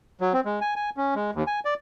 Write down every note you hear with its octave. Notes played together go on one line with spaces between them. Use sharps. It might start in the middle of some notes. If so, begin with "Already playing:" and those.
F#3
C4
G#3
G#5
G#5
C#4
G#3
D#2
G#5
D5